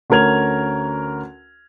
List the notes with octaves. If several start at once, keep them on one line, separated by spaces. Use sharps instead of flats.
D2 C#4 A#4 G#6 F7